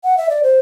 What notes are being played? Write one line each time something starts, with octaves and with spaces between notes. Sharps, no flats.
F#5
E5
D5
C5